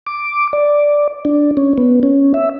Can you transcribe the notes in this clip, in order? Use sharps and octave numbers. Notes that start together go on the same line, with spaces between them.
D6
D5
D4
C#4
B3
C#4
E5